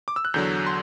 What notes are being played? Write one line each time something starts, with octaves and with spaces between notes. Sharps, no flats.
D6
E6
F#6
E2 D3 F#3 G6
C6